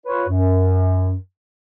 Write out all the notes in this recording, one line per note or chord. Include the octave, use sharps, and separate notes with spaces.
F4 B4 C#5
F#2